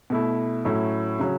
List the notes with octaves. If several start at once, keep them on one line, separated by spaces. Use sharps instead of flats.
B2 A3 E4
A2 F#3 A3 C#4 E4
C#3 F#3 C#4